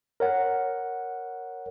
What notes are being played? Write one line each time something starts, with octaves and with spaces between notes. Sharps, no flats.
A#4 C#5 F#5